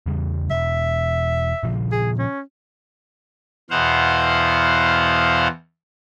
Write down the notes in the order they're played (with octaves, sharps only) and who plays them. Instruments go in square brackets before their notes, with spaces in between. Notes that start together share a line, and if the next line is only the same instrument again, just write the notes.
[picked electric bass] E2 C#3 G3
[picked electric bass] E1 [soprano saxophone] E5
[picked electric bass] A#2 C#3 F3
[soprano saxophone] G#4
C#4
[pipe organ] E2 B2 C5 F5 F#5